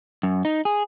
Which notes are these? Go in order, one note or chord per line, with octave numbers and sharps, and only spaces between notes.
F#2
D#4
G#4